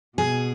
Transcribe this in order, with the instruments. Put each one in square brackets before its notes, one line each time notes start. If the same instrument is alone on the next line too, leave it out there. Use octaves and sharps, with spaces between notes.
[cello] B2 [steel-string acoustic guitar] G#4